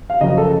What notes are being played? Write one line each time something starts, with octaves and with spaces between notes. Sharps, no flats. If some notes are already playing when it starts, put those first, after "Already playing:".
F5
F#1 F#2 F3 D#5
A4